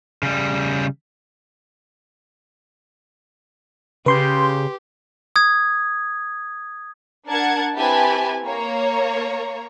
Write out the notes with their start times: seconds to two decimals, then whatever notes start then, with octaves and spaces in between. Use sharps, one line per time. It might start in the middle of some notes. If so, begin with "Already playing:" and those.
0.23 C#3 G3
4.06 C#3 G4 B4 C6 G6
5.36 D#6 G#6
7.27 D4 A#4 F#5 A5 G#6
7.76 C4 E4 G4 B4 G#5 A5
8.45 A#3 C#5 A#5